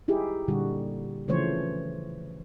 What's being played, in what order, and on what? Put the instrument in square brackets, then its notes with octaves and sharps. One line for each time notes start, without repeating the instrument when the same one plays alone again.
[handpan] D#4 E4 G4 G#4
A#2 D3 G3 F#4
C#3 E3 F3 A3 C5 C#5